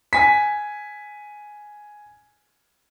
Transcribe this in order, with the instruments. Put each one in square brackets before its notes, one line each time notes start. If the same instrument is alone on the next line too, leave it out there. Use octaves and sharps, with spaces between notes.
[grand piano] G#5 B6